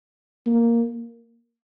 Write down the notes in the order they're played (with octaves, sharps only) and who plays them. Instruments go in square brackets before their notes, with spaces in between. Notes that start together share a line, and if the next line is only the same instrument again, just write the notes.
[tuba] A#3